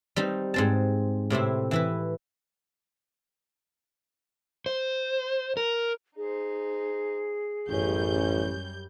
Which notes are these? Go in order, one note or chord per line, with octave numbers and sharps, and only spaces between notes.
G3 C4 D#4
G#2 C4 A5
A2 C3 C4 E4
E3 E4 B4
C5
A#4
D#4 G#4 C5
A1 F#2 G3 C#4 G6